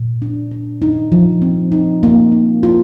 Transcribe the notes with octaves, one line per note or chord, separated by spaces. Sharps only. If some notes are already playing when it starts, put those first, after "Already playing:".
Already playing: A#2
D4
D4
D#4
F3
C4
D#4
A#3
D#4
F4